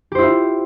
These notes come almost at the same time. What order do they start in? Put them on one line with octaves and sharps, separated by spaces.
G4 C5 E4 F4